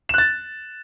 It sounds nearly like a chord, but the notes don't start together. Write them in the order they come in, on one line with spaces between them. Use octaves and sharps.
E7 F#6 A6